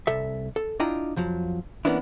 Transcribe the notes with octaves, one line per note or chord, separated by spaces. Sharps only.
C2 A4 E5
A4
D4 E4 F4 D#5 G5 A#5
F2 F3 F#3
E3 A#3 B3 C#4 D4 E4